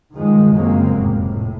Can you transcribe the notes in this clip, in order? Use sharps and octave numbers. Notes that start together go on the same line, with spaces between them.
G2 D#3 F3 G#3
F#2 C#3 F#3 G#3 A#3 C4
F1 A2
A2